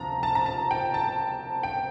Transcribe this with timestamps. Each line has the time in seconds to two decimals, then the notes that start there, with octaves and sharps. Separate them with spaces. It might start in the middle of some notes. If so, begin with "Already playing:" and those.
Already playing: D2 C3 F3 A5 A#5
0.23 A5
0.35 A#5
0.46 A5
0.71 G5
0.94 A5
1.63 G5